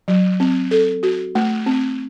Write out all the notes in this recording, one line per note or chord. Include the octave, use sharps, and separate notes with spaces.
F#3
C4
A4
F#4
A3
C4